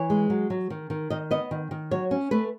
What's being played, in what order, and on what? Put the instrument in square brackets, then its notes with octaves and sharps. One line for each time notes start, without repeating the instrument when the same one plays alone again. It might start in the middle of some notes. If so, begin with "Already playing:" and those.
Already playing: [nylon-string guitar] E3 C#5
G#3
F#3
F#3
D#3
D#3
D#3 D#5
B3 D#5
D#3
D#3
F#3 C#5
C#4
A3 B4